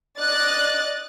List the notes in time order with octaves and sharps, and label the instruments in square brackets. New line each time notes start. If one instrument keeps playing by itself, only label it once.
[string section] D5 D#5 F#6 A6